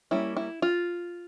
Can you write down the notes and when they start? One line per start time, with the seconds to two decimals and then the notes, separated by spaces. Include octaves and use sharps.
0.11 G3 A#3 C#4 E4
0.37 E4
0.62 F4